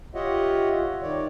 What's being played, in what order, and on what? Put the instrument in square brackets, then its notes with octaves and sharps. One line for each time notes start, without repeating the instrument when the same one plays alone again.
[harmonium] F4 G4 C#5 D#5 E5 F#5
D#3 C#5 D5